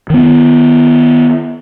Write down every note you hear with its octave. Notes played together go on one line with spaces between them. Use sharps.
D#3 B3